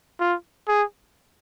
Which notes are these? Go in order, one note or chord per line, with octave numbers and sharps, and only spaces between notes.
F4
G#4